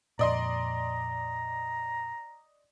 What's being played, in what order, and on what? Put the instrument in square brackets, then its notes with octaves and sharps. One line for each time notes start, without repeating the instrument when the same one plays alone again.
[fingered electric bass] F2 A#2 [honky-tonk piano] D5 D#5 C6 [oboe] A#5